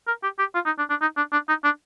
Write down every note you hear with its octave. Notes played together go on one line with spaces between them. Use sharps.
A#4
G4
G4
F4
D#4
D4
D4
D#4
D4
D4
D#4
D4